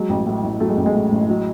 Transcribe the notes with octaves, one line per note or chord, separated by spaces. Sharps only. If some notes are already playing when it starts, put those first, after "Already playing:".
Already playing: F#3 G#3
A1
A2
A1
F#3 A3
G#3
A1 A3
G#3
A2
A1
F#3